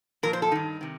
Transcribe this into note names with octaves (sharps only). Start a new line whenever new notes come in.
A#2 F3 A#4
C5
A4
G2 D#3 D#4
C3 D#3